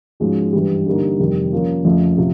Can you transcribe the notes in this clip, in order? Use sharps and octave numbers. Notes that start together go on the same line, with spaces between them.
G#2 F3 G#3 C#4 F#4
G2 E3 G3
D3 G3 A#3 D#4
F2 C3 D#3 G3
F3 A#3 C#4
F2 C#3 F3 A3
C3 F3